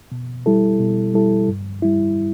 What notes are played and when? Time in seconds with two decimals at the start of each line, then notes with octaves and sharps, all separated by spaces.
0.12 B2
0.46 G3 E4 A4
0.80 B2
1.14 G3 E4 A4
1.48 G2
1.82 G3 E4